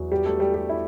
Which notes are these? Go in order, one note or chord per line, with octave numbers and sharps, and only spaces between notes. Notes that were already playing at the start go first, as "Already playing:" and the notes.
Already playing: E2 F#3
G3 G4
A3 A4
G3 G4
G3 G4
E4